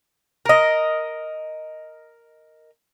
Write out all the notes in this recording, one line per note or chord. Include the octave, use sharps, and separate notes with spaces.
A#4 D#5